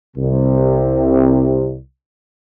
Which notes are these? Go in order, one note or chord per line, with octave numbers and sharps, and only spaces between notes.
C2 C3